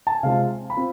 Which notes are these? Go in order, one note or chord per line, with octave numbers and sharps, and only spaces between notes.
A5
G#5
C3 G#3 C4 F4 F5
B5
C4 F4